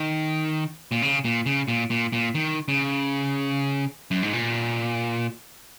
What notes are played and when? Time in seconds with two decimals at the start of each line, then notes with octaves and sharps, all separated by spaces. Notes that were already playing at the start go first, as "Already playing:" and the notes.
Already playing: D#3
0.92 A#2
1.02 C#3
1.24 A#2
1.46 C#3
1.68 A#2
1.90 A#2
2.13 A#2
2.35 D#3
2.68 C#3
4.11 F#2
4.23 G#2
4.33 A#2